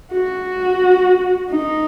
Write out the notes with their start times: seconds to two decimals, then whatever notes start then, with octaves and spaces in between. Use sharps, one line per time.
0.12 F#4
1.51 D#4